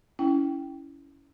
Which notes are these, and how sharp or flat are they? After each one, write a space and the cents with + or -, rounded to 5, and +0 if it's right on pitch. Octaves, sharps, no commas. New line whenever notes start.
C#4 +20 E4 +0 G5 +0